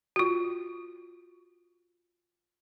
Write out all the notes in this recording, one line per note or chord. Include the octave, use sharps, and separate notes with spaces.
F4 F#4